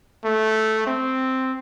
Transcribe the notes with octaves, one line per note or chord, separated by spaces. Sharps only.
A3
C4